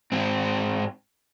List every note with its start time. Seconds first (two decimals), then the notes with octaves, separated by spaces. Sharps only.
0.12 G#2 C4